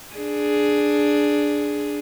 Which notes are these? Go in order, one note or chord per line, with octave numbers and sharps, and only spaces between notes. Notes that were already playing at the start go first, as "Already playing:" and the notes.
D4 G#4